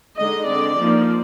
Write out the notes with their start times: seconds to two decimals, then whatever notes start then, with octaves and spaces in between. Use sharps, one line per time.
0.17 D3 G#3 D#4 D#5
0.48 D3 G#3 C4 D5
0.79 F3 A#3 D#4